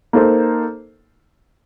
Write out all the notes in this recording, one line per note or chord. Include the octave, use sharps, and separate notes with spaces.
A#3 D#4 A4 C5